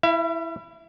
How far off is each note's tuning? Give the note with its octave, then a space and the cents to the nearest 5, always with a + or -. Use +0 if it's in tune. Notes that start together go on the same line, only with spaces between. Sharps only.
E4 +0 E5 +45